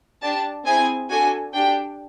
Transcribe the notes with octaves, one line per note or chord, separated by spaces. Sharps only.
D4 G4 A5
C4 E4 G#4 G#5
D4 F#4 A4 G#5
D4 G4 G5